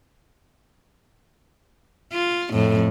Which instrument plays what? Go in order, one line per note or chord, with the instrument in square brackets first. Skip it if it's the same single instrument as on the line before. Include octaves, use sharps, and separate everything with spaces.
[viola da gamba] F4
F2 A2